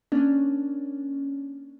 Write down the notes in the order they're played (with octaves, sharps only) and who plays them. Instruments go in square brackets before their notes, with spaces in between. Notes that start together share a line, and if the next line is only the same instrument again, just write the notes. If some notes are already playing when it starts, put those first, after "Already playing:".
[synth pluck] A#3 C#4 D4